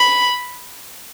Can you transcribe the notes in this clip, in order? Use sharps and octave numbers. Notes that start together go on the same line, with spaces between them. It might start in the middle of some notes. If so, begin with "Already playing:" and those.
Already playing: B5